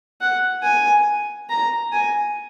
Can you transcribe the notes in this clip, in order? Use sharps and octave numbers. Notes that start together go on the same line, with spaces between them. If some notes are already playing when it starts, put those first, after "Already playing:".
F#5
G#5
A#5
G#5